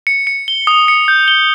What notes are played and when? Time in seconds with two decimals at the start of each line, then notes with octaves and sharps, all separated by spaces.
0.07 C#7
0.27 C#7
0.48 G7
0.67 D#6
0.88 C#7
1.08 G6
1.28 G7